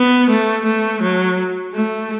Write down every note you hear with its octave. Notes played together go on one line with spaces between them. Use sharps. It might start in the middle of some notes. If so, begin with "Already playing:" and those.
Already playing: B3
A3
A3
F#3
A3